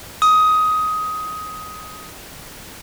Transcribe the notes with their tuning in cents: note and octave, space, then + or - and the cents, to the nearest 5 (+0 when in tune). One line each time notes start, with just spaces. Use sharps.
D#6 +15